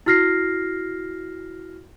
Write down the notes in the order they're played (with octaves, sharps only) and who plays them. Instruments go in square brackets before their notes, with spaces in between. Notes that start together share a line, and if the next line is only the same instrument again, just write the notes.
[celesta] E4 F#4 F6 A#6 C7